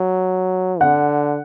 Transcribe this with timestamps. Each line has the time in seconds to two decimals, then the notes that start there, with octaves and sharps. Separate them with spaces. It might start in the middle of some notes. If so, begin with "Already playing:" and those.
Already playing: F#3
0.81 D3 F#5